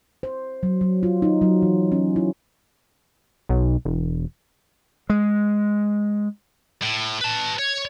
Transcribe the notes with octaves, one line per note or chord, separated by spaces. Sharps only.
C5
F#3
F#3
F4
D#4
F#3
E3
C#4
E4
B1
E1
G#3
A2
B4 A5
C#5